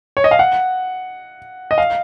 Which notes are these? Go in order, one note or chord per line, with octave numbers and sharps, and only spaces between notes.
C#5
D#5
F5
F#5
D#5
F5